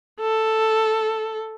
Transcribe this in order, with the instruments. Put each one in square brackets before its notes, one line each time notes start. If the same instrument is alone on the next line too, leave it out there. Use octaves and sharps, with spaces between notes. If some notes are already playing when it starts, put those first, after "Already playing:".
[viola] A4